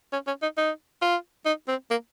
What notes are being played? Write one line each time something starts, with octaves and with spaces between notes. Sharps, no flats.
C#4
C#4
D#4
D#4
F4
D#4
C4
A#3